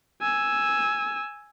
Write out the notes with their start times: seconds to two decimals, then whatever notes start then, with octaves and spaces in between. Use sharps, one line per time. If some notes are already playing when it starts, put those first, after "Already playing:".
0.22 G#5 E6